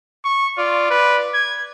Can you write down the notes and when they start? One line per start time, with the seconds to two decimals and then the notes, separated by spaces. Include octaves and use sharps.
0.25 C#6
0.58 F4 D5
0.90 B4
1.34 G#6